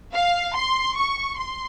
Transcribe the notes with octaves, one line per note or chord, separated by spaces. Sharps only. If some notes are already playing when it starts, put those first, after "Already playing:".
F5
C6
C#6
C6